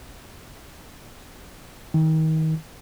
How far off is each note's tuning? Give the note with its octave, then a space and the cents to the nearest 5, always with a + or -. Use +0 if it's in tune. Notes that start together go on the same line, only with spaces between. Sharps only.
D#3 +30